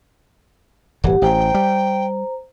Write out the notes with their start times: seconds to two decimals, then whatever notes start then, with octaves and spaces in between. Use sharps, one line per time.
1.04 D1 G1 E3 G4 F#5
1.22 A1 C5 G5 A#5
1.54 G3